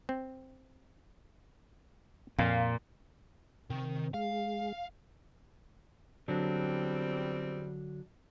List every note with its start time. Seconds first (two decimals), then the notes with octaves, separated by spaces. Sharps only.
0.09 C4
2.39 F2 A#2 F5
3.70 C3 D#3
4.14 G#3 F5
6.28 E2 D3 F#3 G3 C4 D4